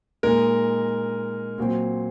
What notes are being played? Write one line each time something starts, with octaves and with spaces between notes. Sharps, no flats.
A#2 G#3 D#4 A#4
A#2 F#3 C4